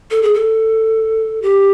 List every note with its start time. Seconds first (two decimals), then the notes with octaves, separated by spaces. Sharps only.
0.11 A4
0.23 G#4
0.34 A4
1.42 G4